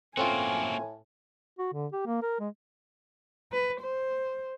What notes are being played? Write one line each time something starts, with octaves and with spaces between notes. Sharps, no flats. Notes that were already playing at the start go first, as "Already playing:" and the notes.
A2 A#3 C4 C#4 F4 F#4 G#5
F#4
D3
G4
A#3
A#4
G#3
B4
C5